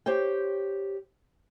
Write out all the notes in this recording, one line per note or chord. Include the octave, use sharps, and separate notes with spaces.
G4 C5 C#5 G5